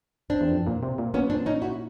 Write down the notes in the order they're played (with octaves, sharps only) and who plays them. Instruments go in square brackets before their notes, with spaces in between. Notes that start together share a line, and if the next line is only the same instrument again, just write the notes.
[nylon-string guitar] C4 D4
[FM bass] E2
F2
A#2
C3
A#2
[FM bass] A#2 [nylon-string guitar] B3 C#4
[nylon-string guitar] C4 D4
C#4 D#4
E4 F#4